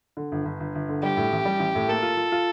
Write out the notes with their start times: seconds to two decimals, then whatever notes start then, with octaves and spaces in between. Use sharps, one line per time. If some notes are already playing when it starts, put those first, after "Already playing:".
0.17 D3
0.32 G1
0.45 G1
0.60 G1
0.75 G1
0.89 D3
1.03 G3 G4
1.17 A2
1.32 A1
1.45 G3
1.60 A1
1.75 A2
1.88 A#3 A4
2.02 F4
2.17 F4
2.32 F4